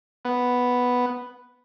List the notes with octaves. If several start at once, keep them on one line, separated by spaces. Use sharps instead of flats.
B3